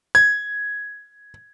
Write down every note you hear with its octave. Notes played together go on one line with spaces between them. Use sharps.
G#6